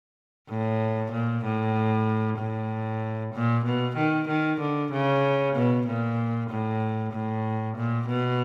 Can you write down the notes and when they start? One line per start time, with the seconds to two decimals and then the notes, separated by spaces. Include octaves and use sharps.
0.49 A2
1.12 A#2
1.44 A2
2.38 A2
3.34 A#2
3.65 B2
3.97 D#3
4.28 D#3
4.60 D3
4.92 C#3
5.55 B2
5.87 A#2
6.50 A2
7.13 A2
7.77 A#2
8.08 B2